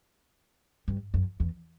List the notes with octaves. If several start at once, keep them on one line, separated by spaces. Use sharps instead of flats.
G2
F#2
E2